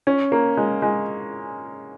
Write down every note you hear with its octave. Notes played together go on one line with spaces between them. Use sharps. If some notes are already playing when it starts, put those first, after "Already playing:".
C#4
A#3
G#3
G#3